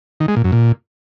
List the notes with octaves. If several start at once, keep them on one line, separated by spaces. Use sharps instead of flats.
D#3
G#3
A#2
F#2
A#2